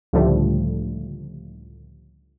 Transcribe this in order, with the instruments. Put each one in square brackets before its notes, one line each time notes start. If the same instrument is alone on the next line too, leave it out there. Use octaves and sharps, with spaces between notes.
[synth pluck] C#2 A2 D3 F3 G3 A3